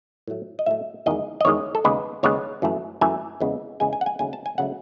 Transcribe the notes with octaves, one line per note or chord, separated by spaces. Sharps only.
A2 F#3 A3
D#5
A2 F#3 A3 E5
E2 D#3 G#3 D#5
D#5
E2 D#3 G#3 C#5
A4
D#2 C#3 G#3 B3 B4
D#2 C#3 G#3 B3 C#5
F#2 E3 A3
F#2 E3 A3 G#5
E2 C#3 G#3 B3
E2 C#3 G#3 B3 G#5
G#5
F#5
G#5
D#2 C#3 F#3 A3 G#5
A5
G#5
C#3 F#3 A3 F#5